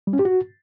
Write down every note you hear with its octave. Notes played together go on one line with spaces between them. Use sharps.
G3
C#4
G4
F#4